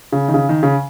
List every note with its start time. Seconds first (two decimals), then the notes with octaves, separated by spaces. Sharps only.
0.12 C#3
0.28 D#3
0.34 C#3
0.49 D#3
0.63 C#3